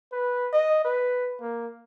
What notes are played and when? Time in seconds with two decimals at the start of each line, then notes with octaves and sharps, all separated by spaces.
0.12 B4
0.53 D#5
0.85 B4
1.41 A#3